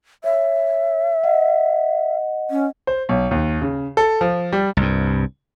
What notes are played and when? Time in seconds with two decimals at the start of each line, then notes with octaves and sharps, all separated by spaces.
0.24 C#5 E5
1.24 D#5 F#5
2.50 C#4
2.87 C5
3.09 B1
3.31 D#2
3.62 C#3
3.97 A4
4.21 F3
4.52 G3
4.77 C2 G2